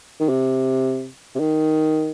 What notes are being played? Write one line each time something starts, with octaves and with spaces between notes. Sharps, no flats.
D#3
C3
C3
D#3